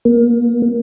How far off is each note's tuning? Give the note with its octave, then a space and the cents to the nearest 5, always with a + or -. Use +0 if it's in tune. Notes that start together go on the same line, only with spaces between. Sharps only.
A#3 +25